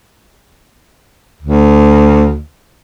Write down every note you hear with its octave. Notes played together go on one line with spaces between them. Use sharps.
D2